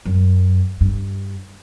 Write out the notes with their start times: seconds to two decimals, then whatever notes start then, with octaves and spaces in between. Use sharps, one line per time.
0.06 F#2
0.81 G2